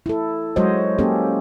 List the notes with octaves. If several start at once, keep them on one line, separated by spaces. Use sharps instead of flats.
E4 A4
F#3 G#3 F#4 C5 C#5 D#5
A#3 C#4 G4 A4